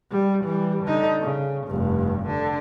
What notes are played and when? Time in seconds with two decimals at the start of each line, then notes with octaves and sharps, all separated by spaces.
0.11 G3
0.44 E3 G3
0.83 D3 D#4
1.21 C#3
1.67 F1 G2
2.27 D3